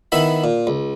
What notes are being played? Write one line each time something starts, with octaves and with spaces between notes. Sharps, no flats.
D#3 B3 E4 E5 B5
A#2
C#2